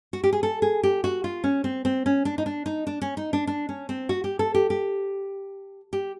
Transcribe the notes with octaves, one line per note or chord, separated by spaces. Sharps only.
F#4
G4
G#4
A4
G#4
G4
F#4
F4
C#4
C4
C4
C#4
D4
D#4
D4
D#4
D4
C#4
D#4
D4
D4
C#4
C4
F#4
G4
A4
G4
G4
G4